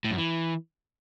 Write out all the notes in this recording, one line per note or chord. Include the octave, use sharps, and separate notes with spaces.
A2
F#2
E3